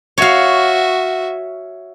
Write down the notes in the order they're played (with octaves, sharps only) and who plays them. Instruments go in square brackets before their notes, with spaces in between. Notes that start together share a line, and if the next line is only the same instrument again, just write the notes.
[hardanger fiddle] F#4 E5 [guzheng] C#5 F5